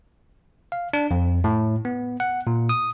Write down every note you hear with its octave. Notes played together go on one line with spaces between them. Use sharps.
F5
D4
F2
A2
B3
F#5
A#2
D#6